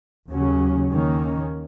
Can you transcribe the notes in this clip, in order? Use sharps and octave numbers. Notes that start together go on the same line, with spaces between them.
D#2 C#3 F#3 C#4
D#2 D#3 A#3 C#4